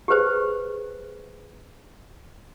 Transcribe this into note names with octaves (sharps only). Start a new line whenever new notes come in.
G4 G#4 B4 C5